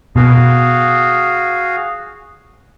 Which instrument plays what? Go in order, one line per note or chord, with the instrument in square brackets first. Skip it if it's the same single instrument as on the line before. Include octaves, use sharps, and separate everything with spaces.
[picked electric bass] B2 [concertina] F#4 G#4 F5